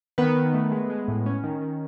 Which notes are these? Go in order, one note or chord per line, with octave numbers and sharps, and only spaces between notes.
D#3 B3 B4
D#3
A3
G#3
G#3
A2
C#4
D#3
D#3